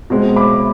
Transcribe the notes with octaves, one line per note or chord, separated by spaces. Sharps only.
B2 G#3 C4
B5 D6